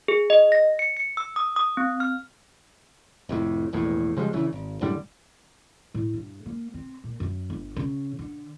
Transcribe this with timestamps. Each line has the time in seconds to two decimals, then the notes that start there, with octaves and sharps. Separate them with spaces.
0.08 G#4
0.30 D#5
0.52 A#6
0.79 C#7
0.97 C#7
1.17 E6
1.36 D#6
1.56 D#6
1.77 C4
2.00 F6
3.29 F1 F2 A2
3.73 E1 A#1 E2 A2
4.17 C#3 F3 G3 G#3
4.33 A#1 C#3 E3
4.53 G#1
4.81 F#2 A2 D3 G3
5.94 A2
6.14 G2
6.46 A#3
6.74 C4
7.04 A#2
7.20 F#2
7.50 G1
7.76 C#3
8.19 D3